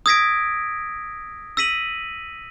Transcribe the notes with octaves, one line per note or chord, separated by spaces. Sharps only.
D#6 E6 G#6 A#6 B6 D7
E6 A#6 B6 D#7 F#7